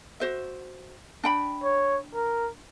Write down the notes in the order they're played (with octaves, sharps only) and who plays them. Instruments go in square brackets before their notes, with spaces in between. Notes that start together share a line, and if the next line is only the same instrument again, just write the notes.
[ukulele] F#4 C5 E5
D4 G5 B5
[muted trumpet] C#5
A#4